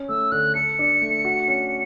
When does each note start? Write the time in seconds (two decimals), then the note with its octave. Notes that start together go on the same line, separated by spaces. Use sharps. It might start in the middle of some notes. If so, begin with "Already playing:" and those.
Already playing: C#4
0.09 A3 E6
0.32 D3 F#6
0.55 A4 C#7
0.79 D4
1.01 A3
1.25 F#4
1.48 C#4